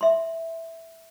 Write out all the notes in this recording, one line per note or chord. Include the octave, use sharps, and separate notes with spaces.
E5 C6